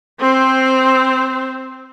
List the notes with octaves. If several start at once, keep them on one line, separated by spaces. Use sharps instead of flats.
C4 C5